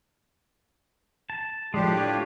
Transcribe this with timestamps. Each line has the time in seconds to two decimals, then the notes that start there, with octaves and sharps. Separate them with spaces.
1.30 A5
1.74 A2 F3 G#3 D4 G4
1.97 F4 C#5 D5